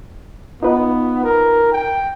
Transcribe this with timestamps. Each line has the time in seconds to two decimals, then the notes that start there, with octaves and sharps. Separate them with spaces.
0.63 B3 D#4 F4 B4
1.24 A#4
1.72 G5